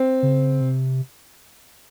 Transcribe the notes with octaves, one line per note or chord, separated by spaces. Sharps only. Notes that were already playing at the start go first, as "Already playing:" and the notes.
Already playing: C4
C#3
C3